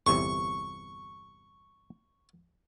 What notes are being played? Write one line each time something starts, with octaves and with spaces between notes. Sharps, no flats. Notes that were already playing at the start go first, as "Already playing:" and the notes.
G1 E2 C3 C#6